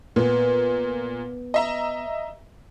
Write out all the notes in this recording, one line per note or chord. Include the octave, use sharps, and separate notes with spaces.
A#2 B3
D#5 E5 A#5